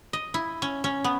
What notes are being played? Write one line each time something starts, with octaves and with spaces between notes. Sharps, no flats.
D#5
E4
C#4
C#4
B3